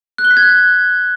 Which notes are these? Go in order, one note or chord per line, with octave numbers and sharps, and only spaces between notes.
F#6
G7
B6
G#6
F#6